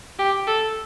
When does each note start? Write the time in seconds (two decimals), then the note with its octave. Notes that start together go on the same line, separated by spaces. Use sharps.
0.19 G4
0.47 A4